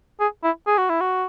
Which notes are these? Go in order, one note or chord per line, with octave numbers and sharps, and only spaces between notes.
G#4
E4
G#4
F#4
E4
F#4